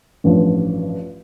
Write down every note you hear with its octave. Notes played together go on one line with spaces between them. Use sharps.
A1 G2 F3